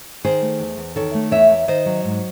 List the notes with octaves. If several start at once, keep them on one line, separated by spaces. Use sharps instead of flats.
D#3 G#4 C5
A3
E2
E2
D#3 A4 C#5
A3
E2 C#5 E5
E2
D#3 C5 D#5
F#3
G#2